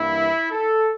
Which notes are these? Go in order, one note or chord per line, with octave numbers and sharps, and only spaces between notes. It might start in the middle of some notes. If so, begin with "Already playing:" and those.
Already playing: G2 E3 G3 A#3 E4
A4